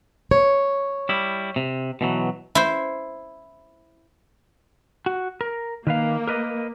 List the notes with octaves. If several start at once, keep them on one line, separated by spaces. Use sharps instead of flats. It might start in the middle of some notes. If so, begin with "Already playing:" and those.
C#5
G3 E4
C3
B2 E3 F#3
E4 C5
F#4
A#4
D#3 A#3 B4 F5
A#4 B4 D#5